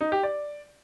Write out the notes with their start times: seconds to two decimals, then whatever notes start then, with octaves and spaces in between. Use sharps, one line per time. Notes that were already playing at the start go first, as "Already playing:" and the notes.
0.01 D#4
0.12 G4
0.23 D5